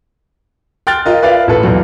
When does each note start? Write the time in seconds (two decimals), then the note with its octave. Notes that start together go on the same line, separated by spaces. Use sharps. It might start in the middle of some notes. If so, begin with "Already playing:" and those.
0.87 G5 C6 F6 F#6 A6
1.06 F4 A#4 D#5
1.23 B4 D5 E5 F5
1.47 A1 A2 F4 A4 B4
1.63 B1 E2 A#2